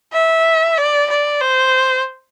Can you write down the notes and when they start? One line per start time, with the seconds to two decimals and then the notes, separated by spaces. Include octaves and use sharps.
0.13 E5
0.77 D5
1.10 D5
1.41 C5